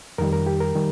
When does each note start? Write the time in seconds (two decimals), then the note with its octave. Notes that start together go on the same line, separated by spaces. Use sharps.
0.18 F2 D#3 G3 A#4
0.33 A#4
0.47 G4
0.60 A#4
0.75 D#3 G3